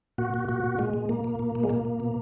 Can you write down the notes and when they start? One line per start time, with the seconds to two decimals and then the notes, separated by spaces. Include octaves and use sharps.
0.18 A#2 F#4
0.34 A#2
0.48 A#2 F#4
0.64 A#2
0.78 A#2 G#3
0.93 A#2
1.09 A#2 A#3
1.24 A#2
1.39 A#2
1.55 A#2
1.63 G#3
1.69 A#2 A#3
1.85 A#2
2.00 B2